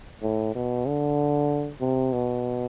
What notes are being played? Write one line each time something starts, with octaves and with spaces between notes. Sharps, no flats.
A2
B2
D3
C3
B2